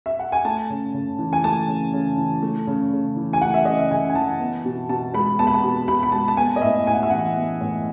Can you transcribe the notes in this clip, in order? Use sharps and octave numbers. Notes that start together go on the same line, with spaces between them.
E5
F#5
G#5
A3 A5
C#3
C#3
E3
G#5
A3 A5
C#3
C#3
E3
A3
C#3
C#3
E3
G#5
A3 F#5
E5
C#3 D#5
E5
C#3 G#5
G#5
E3 A5
B3
B2
B2 A5
G#3 B5
B3 A5
B5
A5
B2
B2 B5
B5
G#3 A5
A5
B3 G#5
D#5
A2 E5
A2 G#5
F#5
E5
E3 F#5
B3
A2